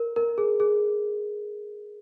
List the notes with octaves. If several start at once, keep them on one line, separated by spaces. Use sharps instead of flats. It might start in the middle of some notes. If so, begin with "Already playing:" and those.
Already playing: A#4
A#4
G#4
G#4